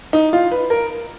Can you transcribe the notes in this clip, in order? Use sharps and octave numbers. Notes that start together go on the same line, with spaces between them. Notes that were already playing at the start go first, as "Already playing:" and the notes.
D#4
F4
B4
A#4